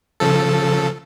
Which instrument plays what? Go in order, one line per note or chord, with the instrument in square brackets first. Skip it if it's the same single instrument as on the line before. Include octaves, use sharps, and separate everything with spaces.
[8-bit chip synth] C#3 F3 A4